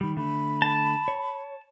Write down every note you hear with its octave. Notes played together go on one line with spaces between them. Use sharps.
D#3 G3 B5
D3 A3 B5
A5
C#5